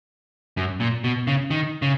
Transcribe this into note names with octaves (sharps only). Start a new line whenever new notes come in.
F#2
A#2
B2
C#3
D#3
C#3